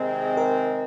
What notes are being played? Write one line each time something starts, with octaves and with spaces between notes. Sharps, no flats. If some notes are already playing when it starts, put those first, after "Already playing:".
Already playing: C3 D#3 G#3 C4 G#4
A#4